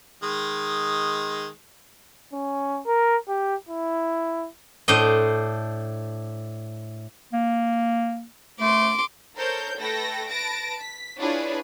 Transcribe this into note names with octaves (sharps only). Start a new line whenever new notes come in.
D#3 G#3
C#4
A#4
G4
E4
A2 D4 C5 D#5
A#3
A3 C6 D6
A4 A#4 C5 C#5 G6
A3 A4 B4 G5 A#6
B4 A5 A#6 D7
B6
D4 E4 F4 G#4 B4 C#5